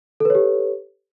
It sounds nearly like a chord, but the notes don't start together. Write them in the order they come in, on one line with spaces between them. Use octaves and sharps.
A4 B4 C#5 G4